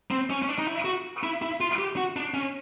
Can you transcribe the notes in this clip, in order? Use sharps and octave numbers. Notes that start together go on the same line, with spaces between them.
C4
C#4
C#4
D4
D#4
E4
F#4
E4
E4
F4
G4
F#4
D4
C#4